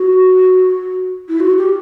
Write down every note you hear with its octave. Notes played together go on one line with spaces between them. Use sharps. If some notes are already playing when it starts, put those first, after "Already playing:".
Already playing: F#4
E4
F#4
G4